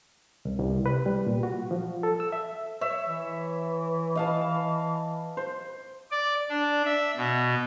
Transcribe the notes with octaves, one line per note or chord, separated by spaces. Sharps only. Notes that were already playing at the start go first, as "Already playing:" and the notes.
C2
C2
B4
G3
A#2
F#4
F3
A4
E6
E5
C#5 E5
E3
D#5 F5 A5
C5
D5
D4
E5
B2